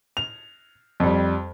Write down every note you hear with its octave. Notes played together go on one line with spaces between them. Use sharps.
F7
F2 G3